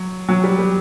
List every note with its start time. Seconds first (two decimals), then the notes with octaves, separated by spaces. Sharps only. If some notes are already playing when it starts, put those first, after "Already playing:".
Already playing: F#3
0.29 F#3
0.44 G3
0.59 G3